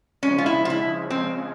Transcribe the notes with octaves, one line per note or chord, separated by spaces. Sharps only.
C#3 F3 G#3 C#4
F4
E4
F4
E4
C4